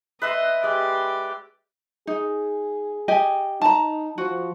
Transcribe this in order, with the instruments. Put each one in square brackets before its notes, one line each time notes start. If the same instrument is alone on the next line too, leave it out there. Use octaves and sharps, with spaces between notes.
[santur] B4 E5 C6 [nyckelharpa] D#5
[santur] G#3 [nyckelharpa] G4 D5
[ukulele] D#4 [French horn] G#4
[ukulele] G4 D#5 G#5
[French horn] D#4 [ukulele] A5 A#5
[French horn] F3 [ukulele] F#4